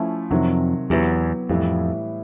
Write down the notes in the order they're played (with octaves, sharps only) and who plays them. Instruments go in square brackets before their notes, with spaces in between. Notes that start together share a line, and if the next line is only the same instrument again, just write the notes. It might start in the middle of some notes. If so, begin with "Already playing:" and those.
Already playing: [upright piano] F3 A3 C#4 E4
[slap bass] F2 [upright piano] C3 D#3 F#3
[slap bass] E2 [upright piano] F#3 B3 E4 G4
[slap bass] F2 [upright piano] A2 E3 G3